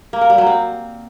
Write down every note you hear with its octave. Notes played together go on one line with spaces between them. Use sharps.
A#3
A#4
G3
F#3
C4